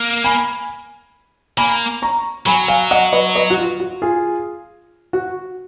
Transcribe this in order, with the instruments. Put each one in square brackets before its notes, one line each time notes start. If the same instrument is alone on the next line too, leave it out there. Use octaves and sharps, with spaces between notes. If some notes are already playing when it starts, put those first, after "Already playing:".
Already playing: [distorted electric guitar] A#3
[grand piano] G#5 B5
[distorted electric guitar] A#3 [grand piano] G#5 B5
[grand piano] A#5 C#6
[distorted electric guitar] F#3 [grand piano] G#5 B5
[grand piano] F5 G#5
D#5 F#5
B4 D#5
B4 D#5
F#4
F4
F#4
F4 G#4
F#4